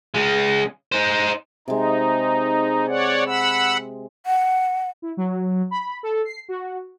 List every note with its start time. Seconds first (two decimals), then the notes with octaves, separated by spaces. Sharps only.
0.14 C#3 G#3
0.92 D#4 C5
1.68 C3 G#3 D#4
2.88 C#5 D5 F#5
3.26 F#5 B5 E6
4.26 F#5
5.02 E4
5.17 F#3
5.71 B5
6.03 A4
6.25 C7
6.49 F#4